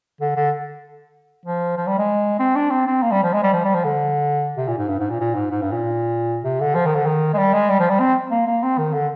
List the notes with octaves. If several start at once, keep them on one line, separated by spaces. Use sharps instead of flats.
D3
D3
F3
F3
G3
G#3
C4
D4
C4
C4
A#3
G3
F3
G#3
G3
F3
G3
F3
D3
C3
A#2
G#2
G2
G#2
A#2
A#2
G#2
G#2
G2
A#2
C3
D3
F3
D#3
D3
D#3
G#3
G3
G#3
G3
F3
G3
C4
A#3
A#3
C4
D#3
D3